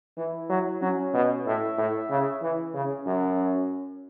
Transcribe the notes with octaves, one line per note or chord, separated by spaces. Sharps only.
E3 E4
F#3
F#3 C#4
B2
A2 E5
A2
C#3
E3
C#3 C#4
F#2